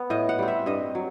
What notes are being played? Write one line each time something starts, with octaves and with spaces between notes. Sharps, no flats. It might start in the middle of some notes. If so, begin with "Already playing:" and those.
Already playing: B3
A2 D#5
F#5
G3 C4
E5
G2 D#5
F#3